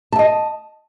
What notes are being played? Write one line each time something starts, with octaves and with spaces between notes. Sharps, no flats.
D#5 E5 A5